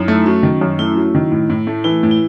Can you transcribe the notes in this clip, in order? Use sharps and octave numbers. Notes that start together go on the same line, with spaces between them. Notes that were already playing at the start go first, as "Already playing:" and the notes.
Already playing: F#2 D#4 E4
A3
F#3 C#4
D#3
F#2
A3 E4
F#3
D#3
A2
A2
A3
E3 E4
A2
E4